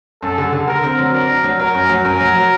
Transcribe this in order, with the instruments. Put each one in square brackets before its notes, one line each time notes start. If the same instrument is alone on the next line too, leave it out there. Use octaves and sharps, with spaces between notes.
[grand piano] F#2 [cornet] A4
[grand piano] D3
D3
[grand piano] D3 [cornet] A#4
[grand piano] C4
F#3
[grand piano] D4 [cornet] A#4
[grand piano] D4
F#3
[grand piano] F#3 [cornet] A#4
[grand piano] F#2
F#3
[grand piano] F#2 [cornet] A#4
[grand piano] F#3
F#3